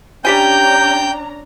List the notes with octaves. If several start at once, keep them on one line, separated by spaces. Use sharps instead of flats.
G3 C#4 D4 G4 G5 G#5 A#5 G6